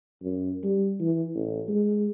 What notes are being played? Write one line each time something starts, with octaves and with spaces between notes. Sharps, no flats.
F#2
G3
E3
A1
G#3